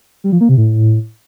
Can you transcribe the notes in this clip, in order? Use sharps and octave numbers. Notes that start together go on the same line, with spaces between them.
G3
F3
A#3
C3
A2